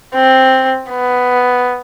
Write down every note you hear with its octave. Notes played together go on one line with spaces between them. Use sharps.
C4
B3